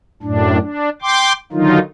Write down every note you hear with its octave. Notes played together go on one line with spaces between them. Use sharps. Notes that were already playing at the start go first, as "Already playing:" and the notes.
F#2 A2 D4
D4
G5 C6 D6
D3 D#3 F#3 D#4 F4